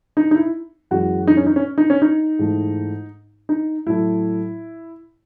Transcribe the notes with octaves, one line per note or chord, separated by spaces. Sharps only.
D#4
D#4
E4
F#2 E3 G#3 F#4
D#4
C#4
D#4
C#4
D#4
C#4
D#4
G#2 E3 A3
D#4
A2 F#3 A3 E4